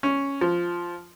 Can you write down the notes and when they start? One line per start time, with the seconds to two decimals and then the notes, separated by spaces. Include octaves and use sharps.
0.03 C#4
0.41 F3